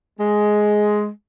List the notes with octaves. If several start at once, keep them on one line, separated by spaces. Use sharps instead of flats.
G#3